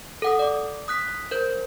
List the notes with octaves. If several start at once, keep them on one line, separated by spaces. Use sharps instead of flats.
A4 F#5 D#6
D5 D6
D#6 F#6 B6
A#4 C5 G6